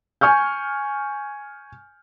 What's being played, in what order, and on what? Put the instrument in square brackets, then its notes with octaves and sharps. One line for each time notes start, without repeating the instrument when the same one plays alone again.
[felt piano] G#5 C#6 F6 G6